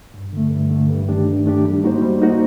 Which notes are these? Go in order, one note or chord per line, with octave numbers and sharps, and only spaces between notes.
G2
D3 A3
G2
D3 A3
G2
D#3 A3 D4 G4
G2
D#3 A3 D4 G4
G3
A#3 D#4 F#4 C5
G3
A#3 D#4 F#4 C5